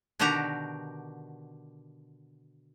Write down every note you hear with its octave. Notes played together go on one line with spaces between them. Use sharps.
B2 D3 D#3 F#4 G4 A#5